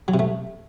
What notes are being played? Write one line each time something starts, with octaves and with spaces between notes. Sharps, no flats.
F#3
C3
A3